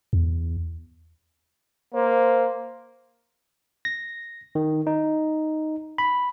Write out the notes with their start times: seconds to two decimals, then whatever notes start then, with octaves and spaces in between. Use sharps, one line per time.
0.13 E2
1.94 A#3 C5
3.85 A#6
4.55 D#3
4.87 D#4
5.98 B5